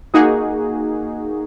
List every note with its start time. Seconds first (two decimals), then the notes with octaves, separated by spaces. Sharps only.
0.14 A#3 D#4 F#4 G#4